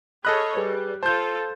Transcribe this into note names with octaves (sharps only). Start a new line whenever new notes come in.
G#4 A4 C#5 D#5 B5 F6 F#6
G3 G#4 B4
F4 A4 C5 A5 G6